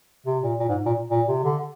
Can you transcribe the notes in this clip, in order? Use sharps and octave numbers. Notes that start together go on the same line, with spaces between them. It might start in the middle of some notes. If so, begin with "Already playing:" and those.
C3
A#2
A#2
G#2
A#2
A#2
C3
D3